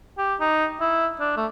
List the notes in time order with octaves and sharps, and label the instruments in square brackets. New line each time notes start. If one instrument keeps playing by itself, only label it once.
[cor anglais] G4
D#4
E4
D4
A3